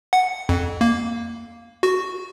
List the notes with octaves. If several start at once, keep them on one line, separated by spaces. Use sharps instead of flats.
F#5
F2
A#3
F#4